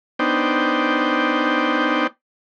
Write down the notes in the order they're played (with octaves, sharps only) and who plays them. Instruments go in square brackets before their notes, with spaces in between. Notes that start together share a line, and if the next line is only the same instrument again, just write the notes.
[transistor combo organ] B3 D4 D#4 C5 G5